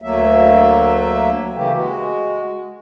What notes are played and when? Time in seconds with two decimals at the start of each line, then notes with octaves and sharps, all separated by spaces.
0.02 D2 F#3 A3 A#3 E5
1.54 C#3 E3 A3 A#3 G4
1.75 G#3 F#4